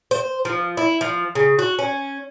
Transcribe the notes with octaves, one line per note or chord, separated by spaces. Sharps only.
C5
F3
E4
F3
C#3
F#4
C#4